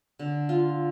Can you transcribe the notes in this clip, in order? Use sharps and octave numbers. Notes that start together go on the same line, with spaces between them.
D3
F4